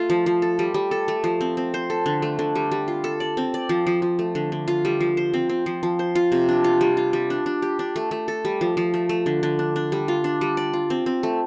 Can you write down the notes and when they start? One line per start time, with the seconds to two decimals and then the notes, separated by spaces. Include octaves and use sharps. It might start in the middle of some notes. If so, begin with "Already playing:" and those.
Already playing: A3 F4 A4
0.10 F3
0.26 F3
0.42 A4
0.59 G3
0.74 G3
0.91 A4
1.08 A3
1.24 F3
1.41 C4
1.57 C4
1.74 C5
1.90 A4
2.06 D3
2.22 A3
2.39 D3
2.55 G3
2.71 G3
2.88 F4
3.04 A4
3.20 D5
3.37 C4
3.54 D5
3.69 F3
3.87 F3
4.02 F3
4.19 A3
4.35 D3
4.52 D3
4.68 F4
4.85 G3
5.01 F3
5.17 C5
5.34 C4
5.49 C4
5.66 F3
5.83 F3
5.99 C5
6.15 F4
6.32 C3
6.49 D4
6.64 F4
6.81 G3
6.97 F4
7.13 G3
7.30 D4
7.46 D4
7.62 G4
7.79 D4
7.96 A3
8.11 A3
8.28 A4
8.45 G3
8.61 F3
8.77 F3
8.94 A3
9.09 A3
9.26 D3
9.43 D3
9.59 D4
9.76 D4
9.92 G3
10.08 F4
10.24 D4
10.41 G3
10.57 D5
10.73 F4
10.90 C4
11.06 C4
11.23 A3